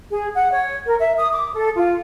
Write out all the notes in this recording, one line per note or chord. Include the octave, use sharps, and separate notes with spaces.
G#4
F#5
C#5
A#4
E5
D#6
D6
A4
F4